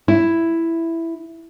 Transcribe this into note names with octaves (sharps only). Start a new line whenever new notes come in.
E4